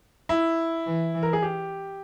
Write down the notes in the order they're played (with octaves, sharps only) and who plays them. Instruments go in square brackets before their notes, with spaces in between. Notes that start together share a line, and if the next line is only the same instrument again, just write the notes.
[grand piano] E4
[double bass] E3
E3
[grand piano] A#4
G#4
G4